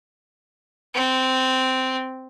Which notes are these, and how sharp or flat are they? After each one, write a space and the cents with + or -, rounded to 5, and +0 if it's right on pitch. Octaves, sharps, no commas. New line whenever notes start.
C4 -10